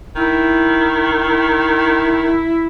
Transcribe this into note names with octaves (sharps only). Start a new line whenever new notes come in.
D#3 E4
E4